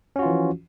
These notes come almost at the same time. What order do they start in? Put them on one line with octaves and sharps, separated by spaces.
C#4 F#4 F4 E3 F3